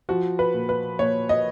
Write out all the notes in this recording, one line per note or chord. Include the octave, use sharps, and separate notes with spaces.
F3 F#4
B4
A#2
B4
A#2 C#5
D#5